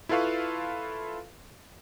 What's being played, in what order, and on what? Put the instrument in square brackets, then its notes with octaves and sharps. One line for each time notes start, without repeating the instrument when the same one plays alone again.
[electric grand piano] E4 F4 A4 B4 F5 C#6